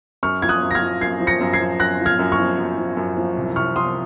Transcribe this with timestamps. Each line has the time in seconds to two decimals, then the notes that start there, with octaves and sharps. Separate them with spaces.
0.23 F#2 C#6 F6
0.42 F3 G#6
0.49 D#6 F#6
0.62 F#2
0.71 A#6
0.75 F6 G#6
0.81 F3
1.01 F#2 G#6 C7
1.21 F3
1.27 A#6 C#7
1.41 F#2
1.53 G#6 C7
1.60 F3
1.80 F#2 F#6 A#6
2.00 F3
2.06 F6 G#6
2.19 F#2
2.32 C#6 F6
2.39 F3
2.59 F#2
2.78 F3
2.97 F#2
3.17 F3
3.37 C2
3.56 C2 C#6 F6
3.76 F3 C6 D#6